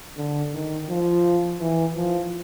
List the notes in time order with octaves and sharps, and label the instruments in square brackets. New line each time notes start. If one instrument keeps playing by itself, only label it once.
[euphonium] D3
D#3
F3
E3
F3